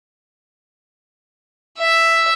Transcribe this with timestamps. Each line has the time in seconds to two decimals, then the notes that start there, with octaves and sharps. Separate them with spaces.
1.78 E5